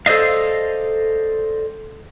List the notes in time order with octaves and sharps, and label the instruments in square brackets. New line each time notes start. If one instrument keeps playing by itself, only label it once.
[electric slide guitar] A4 C5 D5 D#5 F5